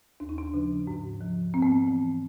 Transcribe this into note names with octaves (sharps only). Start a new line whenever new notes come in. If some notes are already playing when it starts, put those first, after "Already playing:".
D#2 D4
D#4
D4
C#3 F3
G#2
F3
G#2 C4
B3
C4
E3